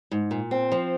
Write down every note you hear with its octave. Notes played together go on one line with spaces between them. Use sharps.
G#2
A#2
C4
F3